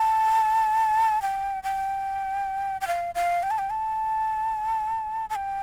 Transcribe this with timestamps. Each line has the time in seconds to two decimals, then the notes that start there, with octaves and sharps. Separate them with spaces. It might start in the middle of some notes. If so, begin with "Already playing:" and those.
Already playing: A5
1.22 G5
1.63 G5
2.81 G5
2.87 F5
3.15 F5
3.43 G5
3.50 A5
3.58 G5
3.70 A5
5.30 A5
5.35 G5